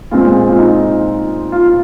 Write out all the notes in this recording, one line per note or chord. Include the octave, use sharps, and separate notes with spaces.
A#2 G#3 C4 F4
F4
D#4
F4